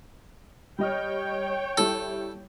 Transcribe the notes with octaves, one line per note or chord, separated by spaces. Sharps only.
G3 C#5 D#5 G5 F6
G3 E4 A4